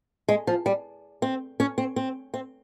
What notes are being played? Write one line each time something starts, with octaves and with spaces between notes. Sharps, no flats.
G#3
F3
G3
C4
C#4
C4
C4
C4